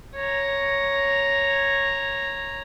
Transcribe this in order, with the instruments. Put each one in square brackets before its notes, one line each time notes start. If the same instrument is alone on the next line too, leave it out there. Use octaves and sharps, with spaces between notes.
[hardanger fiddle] C#5 A#5